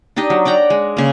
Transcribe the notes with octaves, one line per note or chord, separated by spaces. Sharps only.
D4 D#4 G4 D#5
F#3
D5 F#5 G5 A#5
G#3
C#3 A#3